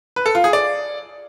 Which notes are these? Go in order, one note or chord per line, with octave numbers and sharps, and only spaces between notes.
B4
A4
F4
G#4
D5